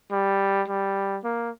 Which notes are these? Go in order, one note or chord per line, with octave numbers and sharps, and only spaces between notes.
G3
G3
A#3